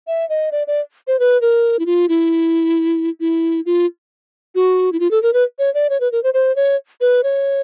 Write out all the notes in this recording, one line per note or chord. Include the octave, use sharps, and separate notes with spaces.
E5
D#5
D5
D5
C5
B4
A#4
E4
F4
E4
E4
F4
F#4
E4
F4
A4
A#4
B4
C#5
D5
C#5
B4
A#4
C5
C5
C#5
B4
C#5